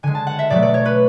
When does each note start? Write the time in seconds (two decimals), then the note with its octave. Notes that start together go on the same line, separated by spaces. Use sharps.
0.03 D3 G#3 G#5
0.15 A5
0.27 F#5
0.39 E5
0.50 B2 F#3 A3 D5
0.62 D5
0.74 C#5
0.85 B4